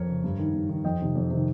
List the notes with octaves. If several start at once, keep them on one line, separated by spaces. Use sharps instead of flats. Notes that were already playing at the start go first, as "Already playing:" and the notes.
Already playing: F2 A#4 C#5
C#3
G2
D#3
G2
D#3
F2 D#5 G5
C3 D#3
F2
C3 D#3